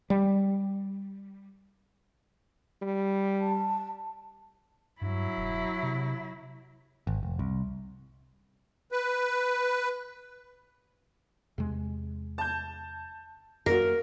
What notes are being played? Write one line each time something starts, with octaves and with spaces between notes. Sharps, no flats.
G3
G3
A5
G2 F#3 E4
E1
C3
G#1
F1
C2
B4
E2 C3 G#3
A5 G6
F#2 A#3 F#4 A#4